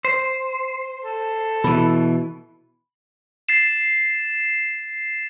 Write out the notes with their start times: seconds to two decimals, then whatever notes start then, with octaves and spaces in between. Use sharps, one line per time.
0.05 C5
1.04 A4
1.64 B2 E3 B5
3.49 A6 C7 E7